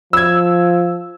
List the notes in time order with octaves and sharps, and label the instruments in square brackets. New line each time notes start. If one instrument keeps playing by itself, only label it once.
[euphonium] F3 [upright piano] E6 G#6